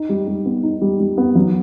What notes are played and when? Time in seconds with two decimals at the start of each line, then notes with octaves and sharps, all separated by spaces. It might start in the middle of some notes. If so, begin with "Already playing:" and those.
Already playing: D#4
0.09 G3
0.27 G3
0.45 B3
0.63 D#4
0.81 G3
1.00 G3
1.18 B3
1.35 F#3